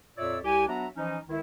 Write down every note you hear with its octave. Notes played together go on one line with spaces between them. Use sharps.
F2 A#2 C#5 D5 E5 E6
C2 G4 G#5
F#3 B3 D4 F#4 E5 A#5
E3 F3 C#4 D#4
C#2 D#3 E4